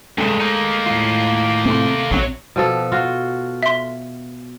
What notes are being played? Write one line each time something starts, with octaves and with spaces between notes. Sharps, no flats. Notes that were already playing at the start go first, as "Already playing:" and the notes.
G2 C3 G#3 A3
A#3 D#4
A2 F4
C3 A3 C4 C6
A#1 E3 F#3 C4
B2 F3 A4
F4 F#4
E5 C6